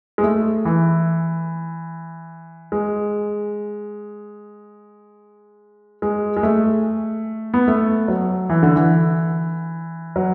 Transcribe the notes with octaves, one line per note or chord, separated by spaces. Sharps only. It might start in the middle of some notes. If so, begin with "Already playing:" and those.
G#3
A3
E3
G#3
G#3
G#3
A3
B3
A3
F#3
E3
D3
E3
F#3